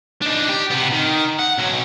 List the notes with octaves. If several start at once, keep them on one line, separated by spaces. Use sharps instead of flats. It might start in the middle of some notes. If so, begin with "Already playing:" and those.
D4 D#4
G4
C3 B3
D#3
F#5
B1 F#3